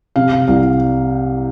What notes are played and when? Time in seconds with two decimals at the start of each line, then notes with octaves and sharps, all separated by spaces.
0.16 C3 F5
0.33 F5
0.48 C2 F5